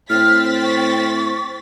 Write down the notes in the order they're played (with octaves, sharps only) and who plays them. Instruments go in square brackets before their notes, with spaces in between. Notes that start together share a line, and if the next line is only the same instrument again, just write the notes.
[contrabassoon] A2 [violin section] C4 A6 B6 [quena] F6
[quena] C#6